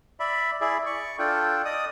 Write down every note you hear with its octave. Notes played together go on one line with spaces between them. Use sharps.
D5 E5 B5
E4 G#4 D5 E5
D5 C#6
D4 F4 A4 G5
D5 D#5 D#6